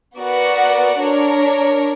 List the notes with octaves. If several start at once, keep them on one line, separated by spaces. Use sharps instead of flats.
B3 F#4 A#4 D5 F#5
D4 A#4 C#5